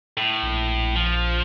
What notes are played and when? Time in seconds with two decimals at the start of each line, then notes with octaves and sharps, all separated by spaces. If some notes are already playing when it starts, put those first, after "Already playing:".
0.18 A2
0.43 A#1
0.96 F3